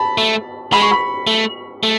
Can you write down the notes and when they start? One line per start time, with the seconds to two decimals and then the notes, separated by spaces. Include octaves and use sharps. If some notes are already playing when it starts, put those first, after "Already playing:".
Already playing: A5 B5
0.18 A3
0.73 G#3 B5
0.82 C#6
0.91 B5
1.27 A3
1.83 A3